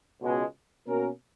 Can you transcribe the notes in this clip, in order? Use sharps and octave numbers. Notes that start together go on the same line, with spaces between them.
C#2 B2 G#3
B2 A#3 C#4 F#4 A#4